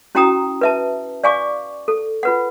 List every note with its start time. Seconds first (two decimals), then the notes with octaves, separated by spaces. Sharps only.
0.15 C#4 E4 F#4 G5 A#5 D#6
0.61 B4 E5 A5
1.24 D5 F5 G#5 C#6 D6
1.88 A4
2.23 F4 B4 F#5